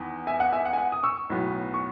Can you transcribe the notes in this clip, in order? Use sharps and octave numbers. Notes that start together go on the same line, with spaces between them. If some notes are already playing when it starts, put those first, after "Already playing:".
Already playing: E2 D#3 B3
E5 G#5
F#5
E5 G#5
F#5
G#5
F#5
D#6
C#6 E6
B1 A2 F#3 B3
C#6